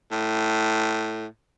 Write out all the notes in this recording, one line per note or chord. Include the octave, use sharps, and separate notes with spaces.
A2